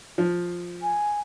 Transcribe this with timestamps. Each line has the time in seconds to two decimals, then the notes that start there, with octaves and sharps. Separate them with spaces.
0.18 F3
0.82 G#5